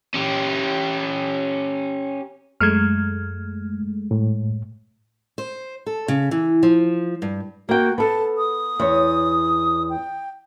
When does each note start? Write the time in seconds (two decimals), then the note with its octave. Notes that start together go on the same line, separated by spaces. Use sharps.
0.14 C#4 G4
2.61 F#2 G#3 A3 F6 G#6
4.11 A2
5.38 C5
5.86 A4
6.08 C#3
6.31 E3
6.63 F3
7.22 G2
7.69 A#3 F#4 G5
7.98 B3 A4 A5
8.38 D#6
8.80 E2 C#5
9.90 G5